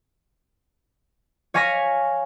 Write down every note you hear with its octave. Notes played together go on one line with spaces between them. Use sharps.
C#5 F5 G#5 C#6 A#6 B6